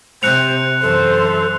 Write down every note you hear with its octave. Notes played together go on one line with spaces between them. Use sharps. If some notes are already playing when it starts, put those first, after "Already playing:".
C3 C5 F#6 C#7 F7
F#2 E3 A4 C5